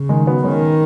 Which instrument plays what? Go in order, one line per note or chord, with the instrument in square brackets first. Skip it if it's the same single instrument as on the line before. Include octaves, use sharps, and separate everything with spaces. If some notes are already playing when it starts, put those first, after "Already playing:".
Already playing: [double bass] C#3
[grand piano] D#3 G#3
F#3 B3
[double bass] D#3 [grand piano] G#3 C#4